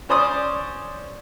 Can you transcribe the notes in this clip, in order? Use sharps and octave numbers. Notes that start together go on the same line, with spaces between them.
C#4 C5 D5 D#6